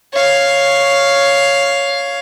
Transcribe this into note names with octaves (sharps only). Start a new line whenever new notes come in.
C#5 F5